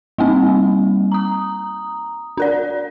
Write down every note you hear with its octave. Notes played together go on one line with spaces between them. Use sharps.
G3 A#3 C4 D#4
A#5 D#6
D4 A#4 D5